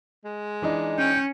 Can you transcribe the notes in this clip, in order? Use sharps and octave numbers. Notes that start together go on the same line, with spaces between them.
G#3
E3 D4 D#4
C#4 G5